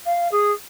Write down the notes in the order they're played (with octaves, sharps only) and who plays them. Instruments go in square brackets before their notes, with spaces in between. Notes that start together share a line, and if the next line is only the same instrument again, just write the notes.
[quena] F5
G#4